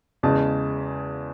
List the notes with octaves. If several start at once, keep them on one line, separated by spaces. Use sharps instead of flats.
E2 C#3 G#3 A5